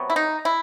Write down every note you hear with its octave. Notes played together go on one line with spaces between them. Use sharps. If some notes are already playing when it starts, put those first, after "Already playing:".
Already playing: C3 F#3 B3
E4
D#4
E4